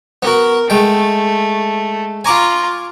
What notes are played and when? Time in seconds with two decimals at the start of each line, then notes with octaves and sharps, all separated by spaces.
0.23 B3 F#4 A#4
0.70 G#3 A3 G5
2.25 F4 G#5 A#5 C#6 D6